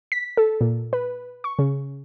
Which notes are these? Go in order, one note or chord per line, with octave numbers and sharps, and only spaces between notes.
B6
A4
A#2
B4
C#6
C#3